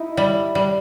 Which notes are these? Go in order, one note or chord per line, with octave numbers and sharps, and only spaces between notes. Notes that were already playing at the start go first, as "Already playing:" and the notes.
Already playing: D#4 E4
G3
G3